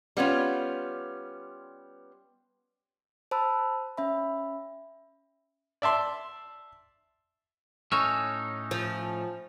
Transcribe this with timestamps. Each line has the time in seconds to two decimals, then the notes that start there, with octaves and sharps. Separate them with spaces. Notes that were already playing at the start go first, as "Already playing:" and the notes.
0.17 G3 B3 C#4 F4
3.31 C5 A5 B5 E6
3.97 C#4 E5 B5
5.82 D5 E5 A5 C6
7.92 A2 C#4 D#4 C#6 E6 F6
8.71 F3